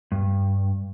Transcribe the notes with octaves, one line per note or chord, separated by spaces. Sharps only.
G2